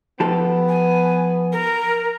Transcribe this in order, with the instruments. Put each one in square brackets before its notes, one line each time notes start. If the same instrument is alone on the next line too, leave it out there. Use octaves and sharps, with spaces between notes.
[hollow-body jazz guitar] F3 G4 A4 [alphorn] B3
[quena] G#5
A#4